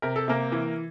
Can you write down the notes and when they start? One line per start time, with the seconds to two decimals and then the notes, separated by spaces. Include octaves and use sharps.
0.02 C3 A#4
0.16 A4
0.28 C3 A#3 A#4
0.52 E3